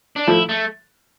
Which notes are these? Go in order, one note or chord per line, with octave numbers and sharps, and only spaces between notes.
D4
F3 A3 E4
A3